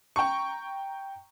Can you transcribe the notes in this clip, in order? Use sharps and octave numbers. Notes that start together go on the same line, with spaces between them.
G5 A#5 C#6